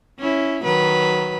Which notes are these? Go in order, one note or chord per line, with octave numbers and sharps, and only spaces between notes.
C#4 E4
D#3 F#3 B4